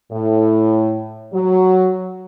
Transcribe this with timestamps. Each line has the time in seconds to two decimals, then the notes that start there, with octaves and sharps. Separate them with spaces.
0.12 A2
1.33 F#3